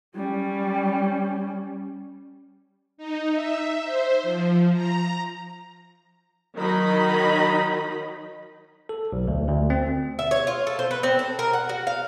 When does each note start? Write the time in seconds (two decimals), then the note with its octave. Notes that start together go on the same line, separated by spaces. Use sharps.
0.16 G3 C#4
2.97 D#4
3.34 E5
3.83 C5
4.23 F3
4.74 A#5
6.57 D#3 F#3 D#4 D#5 B5
8.89 A4
9.12 B1
9.28 D2
9.48 D2
9.70 C4
10.19 E5
10.31 C#5
10.47 F4
10.67 A4
10.79 C5
10.91 B4
11.03 C4
11.19 A4
11.39 A#4
11.53 F#5
11.69 F#4
11.87 F5